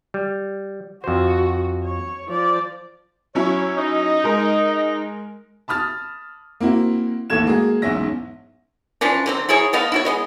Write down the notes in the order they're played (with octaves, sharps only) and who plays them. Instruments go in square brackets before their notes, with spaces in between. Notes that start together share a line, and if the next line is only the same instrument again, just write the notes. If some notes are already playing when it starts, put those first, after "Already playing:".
[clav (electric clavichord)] G3
[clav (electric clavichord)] F2 C5 [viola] F#4
[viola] C#5
F3 D5
[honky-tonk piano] F#3 C#4 E4 [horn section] C#5
[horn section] D#4
[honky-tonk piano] G#3 A#4
[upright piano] A5 B5 D#6 F6 A6
A#3 C4 E4 F#4
A1 D#2 A3 A4 G#6 E7
G#3 A#3 F#4 G#4
B1 E2 G#2 C#4 E5 A#6
[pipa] E3 F3 C#4 D4
D3 F#3 C4
F#3 E4 G#4 C#5
A3 B3 D#5 F5
E4 F#4 C#5
G#3 B3 D#5